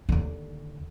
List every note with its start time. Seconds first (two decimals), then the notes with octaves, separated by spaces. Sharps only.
0.09 D#2 D3